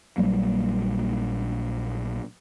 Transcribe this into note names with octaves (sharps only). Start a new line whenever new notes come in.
A#1 F#3 G3 A#3